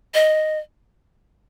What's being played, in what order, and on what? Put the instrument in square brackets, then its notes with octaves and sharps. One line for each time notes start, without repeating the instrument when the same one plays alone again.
[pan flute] D#5